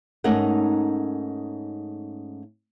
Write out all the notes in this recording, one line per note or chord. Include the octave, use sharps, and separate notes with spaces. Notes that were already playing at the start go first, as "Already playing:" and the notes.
G#2 A3 C#4 D#4 A#4 F#5